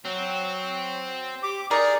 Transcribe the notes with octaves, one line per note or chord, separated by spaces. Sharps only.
F#3 C4
G4 D6
D#4 G#4 A#4 D5